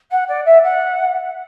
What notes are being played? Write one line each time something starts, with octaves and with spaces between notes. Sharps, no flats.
F#5
D5
E5
F#5